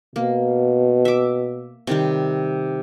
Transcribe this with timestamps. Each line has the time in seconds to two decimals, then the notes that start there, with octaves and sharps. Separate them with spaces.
0.16 B2 A#3
1.05 E5 D6
1.87 C3 D#3 G3